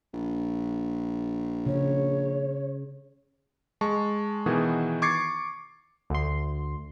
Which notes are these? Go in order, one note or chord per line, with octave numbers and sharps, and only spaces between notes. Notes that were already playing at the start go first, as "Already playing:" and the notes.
A#1
C#3 C#5
G#3 A5 C#6
B2 D#3 E3 B3 F#4 G#4
C#6 D6 G#6 A6 C7 C#7
D2 C6